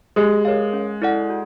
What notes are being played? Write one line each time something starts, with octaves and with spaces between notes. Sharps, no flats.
G#3 G4
A#4 C#5 F5
C#4
E4 A4 D5 F#5
F#4